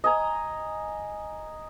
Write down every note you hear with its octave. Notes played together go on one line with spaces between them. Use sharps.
D#5 G#5 A#5